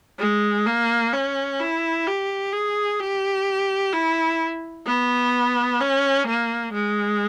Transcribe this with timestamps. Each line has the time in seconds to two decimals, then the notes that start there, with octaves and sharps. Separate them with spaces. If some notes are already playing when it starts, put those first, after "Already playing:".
0.19 G#3
0.66 A#3
1.13 C#4
1.60 E4
2.06 G4
2.52 G#4
2.99 G4
3.93 E4
4.86 B3
5.81 C#4
6.27 A#3
6.74 G#3